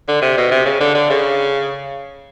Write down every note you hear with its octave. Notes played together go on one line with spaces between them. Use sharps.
D3
C3
B2
C3
C#3
D3
D3
C#3